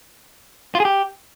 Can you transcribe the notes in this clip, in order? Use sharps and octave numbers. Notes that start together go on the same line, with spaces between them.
F4
G#4
G4